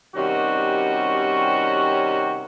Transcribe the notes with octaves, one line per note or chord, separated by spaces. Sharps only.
C3 D#3 G3 C#4 F#4